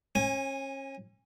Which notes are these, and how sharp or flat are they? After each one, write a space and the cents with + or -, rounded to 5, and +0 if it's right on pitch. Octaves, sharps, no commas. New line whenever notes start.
C#4 -35 G#5 -5